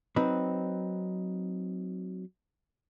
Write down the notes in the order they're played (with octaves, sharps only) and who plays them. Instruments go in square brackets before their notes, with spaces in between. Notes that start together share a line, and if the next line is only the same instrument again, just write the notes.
[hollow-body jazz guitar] F#3 C4 D#4 B4